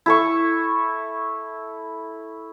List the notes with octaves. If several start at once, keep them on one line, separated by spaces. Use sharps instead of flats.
E4 A4 C#6